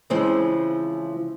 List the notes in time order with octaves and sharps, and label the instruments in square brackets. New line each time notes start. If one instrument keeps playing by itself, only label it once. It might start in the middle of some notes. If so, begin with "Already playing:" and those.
[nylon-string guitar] C#3 E3 F3 G#3 C4 C5